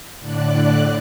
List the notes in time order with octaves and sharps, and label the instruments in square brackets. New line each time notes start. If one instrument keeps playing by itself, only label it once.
[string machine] A2 D3 D5 F#6